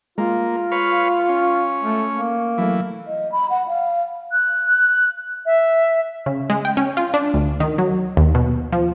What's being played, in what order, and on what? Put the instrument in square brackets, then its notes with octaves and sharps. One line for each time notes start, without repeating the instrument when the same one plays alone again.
[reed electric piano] G#3 [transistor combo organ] A#3 [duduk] F4
[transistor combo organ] B4 C#5 F5
C#4
[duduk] A3
A#3
[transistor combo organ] E3 [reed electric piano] F#3 A3
[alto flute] D#5
B5
F#5
F5
[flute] F#6
E5
[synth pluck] C#3
G#3
G5
C#4
F4
D4
D2
D#3
F#3
D#2
B2
F3